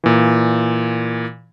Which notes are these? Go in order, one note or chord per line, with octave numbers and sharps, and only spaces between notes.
A#2 E3